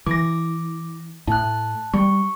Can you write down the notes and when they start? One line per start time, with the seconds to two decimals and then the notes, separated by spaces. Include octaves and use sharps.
0.06 E3 D6 A#6
1.27 A2 A5 F#6
1.94 G3 C#6